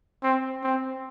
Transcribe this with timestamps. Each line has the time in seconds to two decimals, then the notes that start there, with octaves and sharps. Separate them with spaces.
0.23 C4
0.63 C4